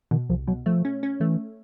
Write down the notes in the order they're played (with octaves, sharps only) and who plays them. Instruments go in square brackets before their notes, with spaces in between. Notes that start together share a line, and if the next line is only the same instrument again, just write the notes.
[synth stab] B2 [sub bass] D#3
[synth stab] C2 [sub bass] F3
[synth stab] B2 [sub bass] F#3
[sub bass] F3 [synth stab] A3
[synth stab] C#4
C#4
[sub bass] E3 [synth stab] A3